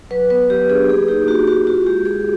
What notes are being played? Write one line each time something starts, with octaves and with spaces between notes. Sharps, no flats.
F#3 B4
B3 B4
F#3 G4
D4 G#4
A#3 G#4
D#4 G4
A#3 F#4
F#4
F4 F#4
G#3 G4
F4 G#4